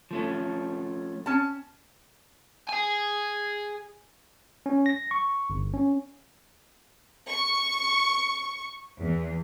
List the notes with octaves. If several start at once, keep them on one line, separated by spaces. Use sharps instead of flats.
F3 A3 C#4
C#4 A5
G#4 G#5
C#4
A#6
C#6
G1
C#4
C#6
E2